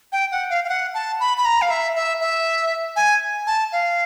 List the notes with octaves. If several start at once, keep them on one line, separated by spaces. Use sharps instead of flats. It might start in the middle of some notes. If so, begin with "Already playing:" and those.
G5
F#5
F5
F5
F#5
A5
B5
B5
A#5
F5
E5
E5
E5
G#5
A5
F5